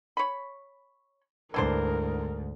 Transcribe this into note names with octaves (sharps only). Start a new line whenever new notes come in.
C#5 B5
D2 G#2 E3 D4 A#4 C5